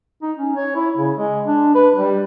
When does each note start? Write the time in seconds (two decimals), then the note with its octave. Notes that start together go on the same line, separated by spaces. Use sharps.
0.22 D#4
0.37 C#4
0.56 C#5
0.75 E4
0.97 C#3
1.17 G#3
1.47 D4
1.75 B4
1.96 G3